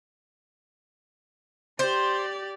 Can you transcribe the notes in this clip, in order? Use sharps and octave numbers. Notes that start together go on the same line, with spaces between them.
G4 C5 D5